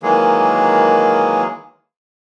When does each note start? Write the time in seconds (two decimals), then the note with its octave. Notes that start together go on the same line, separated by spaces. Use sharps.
0.03 D#3 E3 F#3 G#3 A#3 G#4